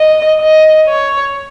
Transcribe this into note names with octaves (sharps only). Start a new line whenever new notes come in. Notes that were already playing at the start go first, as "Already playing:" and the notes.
Already playing: D#5
D#5
C#5